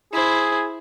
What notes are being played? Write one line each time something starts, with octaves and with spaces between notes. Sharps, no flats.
E4 G#4 C5